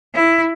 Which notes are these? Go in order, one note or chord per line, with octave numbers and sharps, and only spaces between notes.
E4